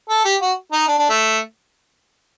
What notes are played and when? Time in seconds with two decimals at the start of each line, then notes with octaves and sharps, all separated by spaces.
0.09 A4
0.25 G4
0.41 F#4
0.72 D#4
0.88 D4
0.99 D4
1.09 A3